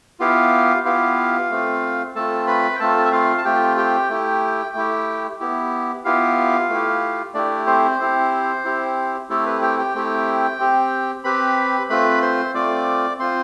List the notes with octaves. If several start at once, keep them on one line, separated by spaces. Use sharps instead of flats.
B3 E4 F4 G4 F5
B3 E4 F4 G4 F5
A3 C4 F4
A3 C4 F4 A4 A5
B4 B5
G5
A3 C4 F4 A4 A5
E5
F4 F5
A5
A3 C4 F4 G4 G5
G4 G5
A3 E4 G4
A3 E4 G4
B3 E4 G4
B3 E4 F4 G4 F5
A3 E4 G4
A3 D4 E4 G4 D5
C4 C5
C4 E4 G4
C4 E4 G4
A3 C4 E4 G4 A4
B4
G4 G5
G4 G5
A3 C4 E4 G4
C4 G4
C4 G4 B4 B5
A3 C4 F4 B4 B5
C5 C6
A3 C4 F4 D5 D6
C4 F4 C5 C6